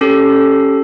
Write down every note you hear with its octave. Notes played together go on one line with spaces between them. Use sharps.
C#4 G4 A4